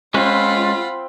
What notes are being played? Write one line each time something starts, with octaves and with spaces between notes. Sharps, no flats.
G#3 C4 C#4 F4 B4 F#5 B5